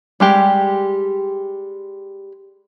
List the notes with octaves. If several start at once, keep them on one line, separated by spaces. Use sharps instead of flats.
G3 G#3 G4